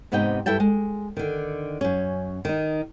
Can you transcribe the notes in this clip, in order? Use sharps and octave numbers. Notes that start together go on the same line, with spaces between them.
G#2 C3 B3 D#4 D#5 G5
G2 E4 A4 G5 A5
G#3
D3 D#3
F#2 C#4
D#3 D#4